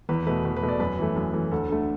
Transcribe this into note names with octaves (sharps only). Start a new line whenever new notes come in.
E2 B4
B2 A3 B4
E2 B4
B4
B2 A3
D5
F#2 B4
E3 A3
F#2
E3 A3
D2 A4
D3 A3